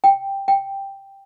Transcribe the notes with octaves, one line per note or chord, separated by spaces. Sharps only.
G5
G5